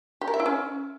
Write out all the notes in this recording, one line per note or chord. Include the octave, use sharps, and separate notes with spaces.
G4
A#4
E5
E4
C#4